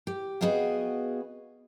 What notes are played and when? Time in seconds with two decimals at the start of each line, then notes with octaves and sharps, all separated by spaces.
0.07 G4
0.41 B3 F#4 G#4 D#5 F5 G5